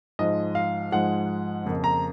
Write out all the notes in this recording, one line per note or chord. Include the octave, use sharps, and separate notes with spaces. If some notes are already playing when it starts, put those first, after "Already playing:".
G#2 F3 G#3 D#5
F5
G#2 F3 G#3 F#5
F2 C#3 F3 A#3
A#5